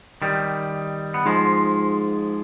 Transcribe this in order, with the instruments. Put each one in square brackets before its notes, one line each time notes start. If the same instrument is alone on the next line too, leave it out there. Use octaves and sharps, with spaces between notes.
[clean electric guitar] D#3 G3
B3
[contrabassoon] G#2 [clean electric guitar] F3 G#3